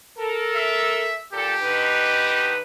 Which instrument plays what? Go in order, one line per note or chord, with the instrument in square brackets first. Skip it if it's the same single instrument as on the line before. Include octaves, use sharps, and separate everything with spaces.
[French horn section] A4 A#4
[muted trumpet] E5
[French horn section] A#2 A4 [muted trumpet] G4
[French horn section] D3 D#4 B4